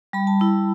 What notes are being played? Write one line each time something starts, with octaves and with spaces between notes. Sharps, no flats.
G3 B5
A5
E4 B5